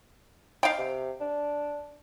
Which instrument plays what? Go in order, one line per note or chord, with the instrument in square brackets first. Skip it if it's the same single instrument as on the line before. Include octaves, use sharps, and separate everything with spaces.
[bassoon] D#4 [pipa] F5 G5
[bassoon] C3
D4